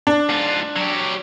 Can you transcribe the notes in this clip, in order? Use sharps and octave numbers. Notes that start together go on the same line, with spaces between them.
D4
G#2 F4
F#3 G4